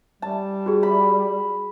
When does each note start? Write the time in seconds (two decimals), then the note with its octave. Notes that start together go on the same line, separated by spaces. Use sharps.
0.22 G3 A5
0.66 F#4 G#4
0.83 B5